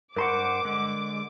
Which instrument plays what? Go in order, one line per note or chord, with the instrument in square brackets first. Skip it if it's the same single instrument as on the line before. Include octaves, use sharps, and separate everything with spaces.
[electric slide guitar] G2 C5 F#5 [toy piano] A#4 A#5 C#6 [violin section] D6
[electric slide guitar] D3 G#3